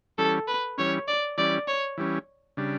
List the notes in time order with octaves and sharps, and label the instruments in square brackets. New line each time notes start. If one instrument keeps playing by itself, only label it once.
[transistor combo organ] E3 G3 C#4 [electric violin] A4
[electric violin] B4
[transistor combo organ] E3 G3 C#4 [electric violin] C#5
[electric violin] D5
[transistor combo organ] E3 G3 C#4 [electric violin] D5
[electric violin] C#5
[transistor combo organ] E3 G3 C#4
C#3 G3 D4